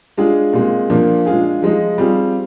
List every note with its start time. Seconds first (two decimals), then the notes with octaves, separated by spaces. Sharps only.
0.17 G#3 D4 F4 G#4
0.53 A#2 G#3 C4
0.90 A#2 F3 A#3 D4
1.26 G#3 D4 F4 G#4
1.62 F3 G#3 D#4
1.98 G3 C4 F4 G#4